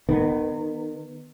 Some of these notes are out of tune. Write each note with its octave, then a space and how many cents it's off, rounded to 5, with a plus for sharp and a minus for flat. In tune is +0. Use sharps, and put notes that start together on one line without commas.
D#3 -30 B3 +0